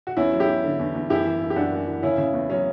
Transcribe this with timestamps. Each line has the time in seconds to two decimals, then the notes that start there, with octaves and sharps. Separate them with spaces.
0.07 F#4
0.17 E2 C#4 E4
0.33 F#3
0.40 E4 G4
0.48 E2
0.64 D3
0.79 E2
0.95 E2
1.09 F#2 E4 G4
1.25 E3
1.40 F#2
1.50 G4
1.56 F#2 D4 F#4
1.72 F#2
1.87 E3
2.03 C#3 C#4 E4
2.18 C#3
2.33 E2
2.49 F#3 C#4